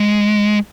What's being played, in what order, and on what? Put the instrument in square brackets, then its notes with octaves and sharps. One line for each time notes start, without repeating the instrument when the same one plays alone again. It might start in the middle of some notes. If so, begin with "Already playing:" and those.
Already playing: [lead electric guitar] G#3